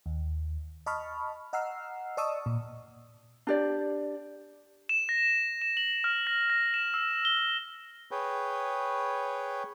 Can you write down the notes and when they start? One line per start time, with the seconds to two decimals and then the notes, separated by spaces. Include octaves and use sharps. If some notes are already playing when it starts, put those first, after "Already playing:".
0.06 D#2
0.86 D#5 A5 B5 C#6 F6
1.53 D#5 F#5 A#5 E6 F6 C7
2.17 D5 D#5 A5 C#6 D#6 E6
2.46 A#2
3.47 D4 G4 D5
4.89 E7
5.09 A#6
5.62 E7
5.77 F#7
6.04 F6
6.27 A#6
6.50 A#6
6.74 E7
6.94 E6
7.25 G7
8.11 G#4 B4 C#5 G5